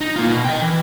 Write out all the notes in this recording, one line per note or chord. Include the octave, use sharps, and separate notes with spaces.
D#4
A#3 F4
B2
D#5 G5
E3